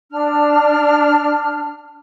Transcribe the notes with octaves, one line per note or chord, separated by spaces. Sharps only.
D4 F6